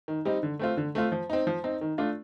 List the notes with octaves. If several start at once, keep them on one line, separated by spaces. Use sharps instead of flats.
D#3
G3 C4 D#4
D3
A3 C4 F4
D3
A3 C4 F4
F3
C4 D#4
F3
C4 D#4
D#3
A3 D4 F4